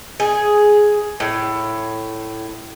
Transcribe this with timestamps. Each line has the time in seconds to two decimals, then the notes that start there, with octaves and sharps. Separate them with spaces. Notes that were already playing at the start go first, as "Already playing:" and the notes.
0.20 G#4
1.20 A2